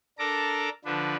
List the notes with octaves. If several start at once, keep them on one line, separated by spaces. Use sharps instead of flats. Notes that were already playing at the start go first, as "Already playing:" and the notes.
D4 A4 A#4 A#5 D6
D3 F3 D4 B4